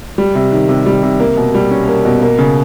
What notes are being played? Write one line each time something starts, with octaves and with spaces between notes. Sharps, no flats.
G3
C3
D#3
C3
G3
C3
A#3
B2
G3
C#4
A#3
B2
A#3
C#3